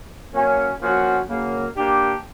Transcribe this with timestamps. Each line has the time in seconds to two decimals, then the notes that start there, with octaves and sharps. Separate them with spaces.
0.33 F#3 A#3 C#4
0.81 F3 A#3 C#4 F#4
1.28 C#3 F#3 A#3
1.76 A#3 D4 G4